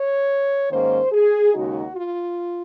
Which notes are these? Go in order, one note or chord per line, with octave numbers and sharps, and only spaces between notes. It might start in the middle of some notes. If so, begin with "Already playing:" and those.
Already playing: C#5
G#2 D#3 A#3 C#4 C5
G#4
D#2 C#3 G#3 D#4 F#4
F4